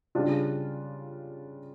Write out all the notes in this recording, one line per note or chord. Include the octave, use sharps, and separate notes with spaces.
C#3 G3 D4 F4